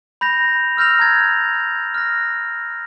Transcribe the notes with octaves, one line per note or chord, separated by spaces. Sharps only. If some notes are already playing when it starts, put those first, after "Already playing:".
B5 G6 A#6 F7
E6 F6 G6 A#6 F7
A#5 F6 G#6 A6
F6 F#6 A#6